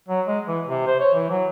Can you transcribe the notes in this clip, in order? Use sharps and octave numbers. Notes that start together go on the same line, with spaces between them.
F#3
G#3
E3
C3
C5
C#5
E3
F#3